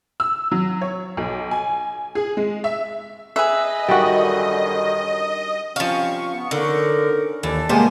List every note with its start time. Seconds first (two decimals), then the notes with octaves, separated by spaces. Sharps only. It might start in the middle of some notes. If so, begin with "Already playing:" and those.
0.20 E6
0.52 F#3
0.81 C#5
1.17 B1
1.51 G#5
2.15 G#4
2.37 G#3
2.64 E5
3.36 G#4 B4 D#5 E5
3.88 F#2 D3 D#3 G3 F#4
5.76 F3 G3 C4 C#4 F5 C#6
6.34 B3
6.51 D3 C#4 D#4 A#4
7.43 D#2 E3 A4 D5 A5
7.69 C3 G3 G#3 A#3 B3 C5